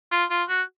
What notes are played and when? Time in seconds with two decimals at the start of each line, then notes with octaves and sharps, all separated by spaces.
0.12 F4
0.30 F4
0.49 F#4